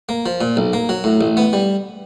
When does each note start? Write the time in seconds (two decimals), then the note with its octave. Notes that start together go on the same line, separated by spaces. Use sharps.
0.09 A#3
0.26 F3
0.41 A#2
0.57 B1
0.73 A#3
0.89 F#3
1.04 A2
1.21 A1
1.37 B3
1.53 G3